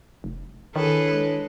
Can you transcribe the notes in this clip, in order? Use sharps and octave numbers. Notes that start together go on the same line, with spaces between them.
F1
D#3 D4 E4 G#4 A4 B4 C#5
G#3